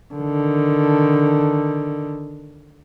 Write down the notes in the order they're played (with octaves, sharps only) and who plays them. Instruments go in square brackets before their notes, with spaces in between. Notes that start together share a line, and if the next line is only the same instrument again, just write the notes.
[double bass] D3 D#3